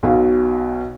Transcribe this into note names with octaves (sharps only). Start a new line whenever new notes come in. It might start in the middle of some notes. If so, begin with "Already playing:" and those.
B1 B2 F5